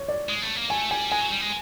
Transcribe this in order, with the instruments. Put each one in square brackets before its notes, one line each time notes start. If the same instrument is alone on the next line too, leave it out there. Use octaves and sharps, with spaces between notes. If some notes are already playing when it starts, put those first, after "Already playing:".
Already playing: [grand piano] C#5
D5
[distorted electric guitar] G#3
A3
A#3
[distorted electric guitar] A3 [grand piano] G#5
[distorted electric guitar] G3 [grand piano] G#5
[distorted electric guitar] G#3 [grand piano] G#5
[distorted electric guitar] F#3
G3
G#3